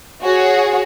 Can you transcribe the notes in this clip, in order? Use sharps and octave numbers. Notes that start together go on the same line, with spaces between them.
F#4 G#4 C#5